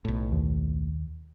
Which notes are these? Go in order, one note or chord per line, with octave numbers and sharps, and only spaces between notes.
B1 A2
D#2